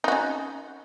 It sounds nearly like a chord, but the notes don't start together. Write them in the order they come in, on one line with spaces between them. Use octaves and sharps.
D#4 F#4 C#4